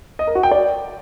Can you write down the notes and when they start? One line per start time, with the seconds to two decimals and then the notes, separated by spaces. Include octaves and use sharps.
0.19 D#5
0.27 A#4
0.35 F#4
0.43 G5
0.51 D5